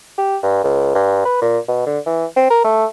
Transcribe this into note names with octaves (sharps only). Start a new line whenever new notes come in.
G4
G2
C#2
G2
B4
A#2
B2
D3
E3
C4
A#4
A3